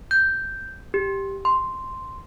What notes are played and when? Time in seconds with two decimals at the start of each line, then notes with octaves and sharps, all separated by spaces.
0.11 G6
0.94 G4
1.45 C6